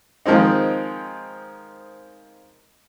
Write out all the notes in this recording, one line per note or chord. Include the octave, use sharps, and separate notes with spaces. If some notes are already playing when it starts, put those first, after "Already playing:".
D#3 F3 G#3 C4 D#4